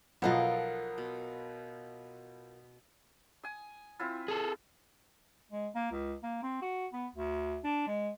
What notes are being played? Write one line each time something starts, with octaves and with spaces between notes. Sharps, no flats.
B1 F3 F#3 F4 A4 A#4 D#5 F#5
B2
G#5 D#6
C4 E4 F4
G#4 A4
G#3
A#3
C#2
A#3
C4
F#4
B3
D2
D4
G#3